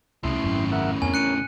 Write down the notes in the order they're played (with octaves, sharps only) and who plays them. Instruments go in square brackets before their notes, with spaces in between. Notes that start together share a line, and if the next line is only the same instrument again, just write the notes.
[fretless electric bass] C2 [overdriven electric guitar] A2 C#3 [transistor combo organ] E4 C6
[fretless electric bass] G#1 F#2
[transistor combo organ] A#4 E5 F#5
[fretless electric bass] F2 B3 C4 [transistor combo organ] A#4 C#5 [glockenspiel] G#5
[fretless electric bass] C#4 D4 [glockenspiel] F#6 C#7 D#7